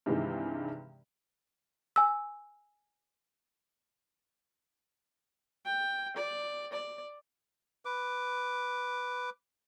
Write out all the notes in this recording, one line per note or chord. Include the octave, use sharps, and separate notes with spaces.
G2 C3 D#3 E3 G#3
G#5 E6
G5
D5
D5
B4 D6